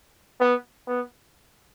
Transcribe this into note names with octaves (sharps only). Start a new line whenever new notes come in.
B3
B3